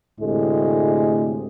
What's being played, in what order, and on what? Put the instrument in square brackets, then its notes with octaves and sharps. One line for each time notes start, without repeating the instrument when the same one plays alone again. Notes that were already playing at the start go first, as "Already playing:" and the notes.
[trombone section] D2 A2 C3 G#3